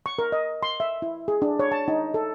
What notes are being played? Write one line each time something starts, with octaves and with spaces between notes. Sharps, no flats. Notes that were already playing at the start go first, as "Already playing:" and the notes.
C#6
A#4
D#5
C6
E5
E4
G#4
D4
C#5
A5
D#4
A4